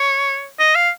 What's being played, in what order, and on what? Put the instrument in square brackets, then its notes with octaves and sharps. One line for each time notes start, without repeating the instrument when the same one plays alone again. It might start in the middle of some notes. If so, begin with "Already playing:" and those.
Already playing: [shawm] C#5
D#5
F5